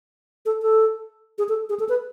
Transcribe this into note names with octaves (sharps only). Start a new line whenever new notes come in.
A4
A4
G#4
A4
G#4
A4
B4